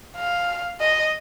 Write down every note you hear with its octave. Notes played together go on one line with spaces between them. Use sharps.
F5
D#5